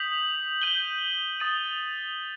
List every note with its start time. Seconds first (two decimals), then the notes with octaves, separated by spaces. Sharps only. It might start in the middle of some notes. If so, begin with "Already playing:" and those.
Already playing: D#6 G6 B6 F#7
0.62 G6 D#7 G7
1.40 D#6 A6 D#7